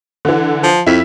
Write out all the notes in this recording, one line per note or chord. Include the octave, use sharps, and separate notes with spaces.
D3 E3
F3
F2 E4 B6